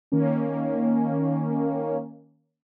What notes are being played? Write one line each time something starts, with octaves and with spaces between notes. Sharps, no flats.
D#3 A#3 C#4